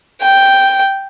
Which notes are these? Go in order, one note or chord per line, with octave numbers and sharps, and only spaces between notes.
G5